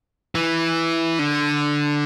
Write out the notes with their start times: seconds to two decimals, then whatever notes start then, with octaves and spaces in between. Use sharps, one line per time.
0.35 E3
1.19 D3